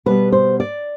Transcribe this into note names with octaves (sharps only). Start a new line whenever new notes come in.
B2 G3 B3 B4
C5
D5